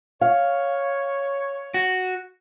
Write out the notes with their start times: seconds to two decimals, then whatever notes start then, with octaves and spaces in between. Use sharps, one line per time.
0.21 C#5 F5
1.74 F#4